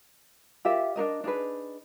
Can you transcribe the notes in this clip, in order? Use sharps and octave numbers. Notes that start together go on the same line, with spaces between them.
F4 G4 A#4 E5
D4 D#4 A#4 D#5
D4 D#4 G#4 B4